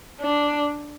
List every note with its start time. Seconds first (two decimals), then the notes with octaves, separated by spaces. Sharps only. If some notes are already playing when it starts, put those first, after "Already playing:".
0.21 D4